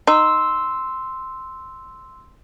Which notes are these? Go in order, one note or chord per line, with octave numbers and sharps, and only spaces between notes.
D#4 C6 E6